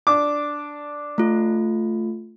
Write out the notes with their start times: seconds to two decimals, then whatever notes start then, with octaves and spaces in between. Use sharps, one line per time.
0.07 D4 D6
1.18 A3 F4